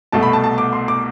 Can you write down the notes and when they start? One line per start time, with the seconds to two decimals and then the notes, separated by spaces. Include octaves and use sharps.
0.12 C2 B2 A3 A5
0.23 B5
0.33 A5
0.44 A5
0.58 D6
0.73 C6
0.88 D6